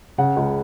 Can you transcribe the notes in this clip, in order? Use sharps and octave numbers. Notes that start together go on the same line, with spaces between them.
C#3 F#5
C#2